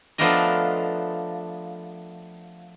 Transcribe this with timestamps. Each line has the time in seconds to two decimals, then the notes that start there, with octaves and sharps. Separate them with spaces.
0.18 F3 A3 B3 D4 A#4 D#5